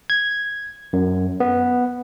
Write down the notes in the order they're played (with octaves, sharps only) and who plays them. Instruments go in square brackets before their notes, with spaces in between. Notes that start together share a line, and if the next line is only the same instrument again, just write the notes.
[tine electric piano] G#6
F#2
B3